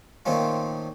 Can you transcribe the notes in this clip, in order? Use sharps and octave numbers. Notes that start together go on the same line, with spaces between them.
A#2 D#3 A3 C4 C#4 F4